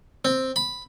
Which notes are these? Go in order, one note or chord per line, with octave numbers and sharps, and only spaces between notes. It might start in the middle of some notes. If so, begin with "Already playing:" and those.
C4
B5